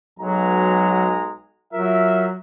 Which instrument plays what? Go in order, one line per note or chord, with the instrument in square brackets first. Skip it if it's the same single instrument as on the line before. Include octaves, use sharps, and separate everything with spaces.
[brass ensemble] B1 G#3 A#5 [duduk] F#3
[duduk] F#3 [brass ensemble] F4 A#4 E5